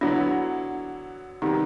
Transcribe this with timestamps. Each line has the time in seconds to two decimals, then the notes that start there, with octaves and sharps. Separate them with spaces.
0.01 D3 F#3 B3 D4 E4
1.42 C3 D#3 G3 B3 D#4